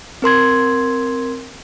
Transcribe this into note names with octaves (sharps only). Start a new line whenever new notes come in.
C4 A#4 C6 G#6